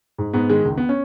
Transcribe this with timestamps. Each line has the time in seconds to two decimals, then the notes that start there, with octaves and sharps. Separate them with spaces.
0.18 G#2
0.33 G#2 B3
0.50 D#3 G#3
0.65 C#2
0.77 B3
0.89 C#4